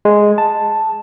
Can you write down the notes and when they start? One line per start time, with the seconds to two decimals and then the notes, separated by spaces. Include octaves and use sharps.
0.05 G#3
0.38 A5